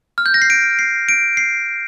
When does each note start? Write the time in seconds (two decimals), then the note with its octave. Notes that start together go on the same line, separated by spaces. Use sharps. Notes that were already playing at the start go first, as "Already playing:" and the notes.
0.18 F6
0.26 G6
0.34 A#6
0.42 C7
0.50 D7
0.79 C7
1.09 D7
1.37 C7